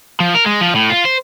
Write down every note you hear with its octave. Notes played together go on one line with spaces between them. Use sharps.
F3
A#4
G#3
F3
A2
F4
C5